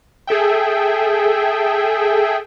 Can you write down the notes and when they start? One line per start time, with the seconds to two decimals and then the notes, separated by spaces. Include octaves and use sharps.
0.27 G#4 A4 E5 G5